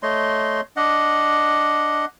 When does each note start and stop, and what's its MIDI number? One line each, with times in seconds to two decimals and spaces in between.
0.03 0.61 57
0.03 0.61 73
0.03 0.61 75
0.03 0.61 84
0.77 2.05 62
0.77 2.05 75
0.77 2.05 78